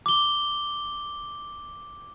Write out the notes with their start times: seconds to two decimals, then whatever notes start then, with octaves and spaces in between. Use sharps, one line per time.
0.06 D6 G7